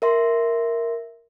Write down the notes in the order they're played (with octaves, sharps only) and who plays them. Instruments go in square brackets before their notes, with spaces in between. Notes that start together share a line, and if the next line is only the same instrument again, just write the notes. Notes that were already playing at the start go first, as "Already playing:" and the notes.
[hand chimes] A#4 E5 C6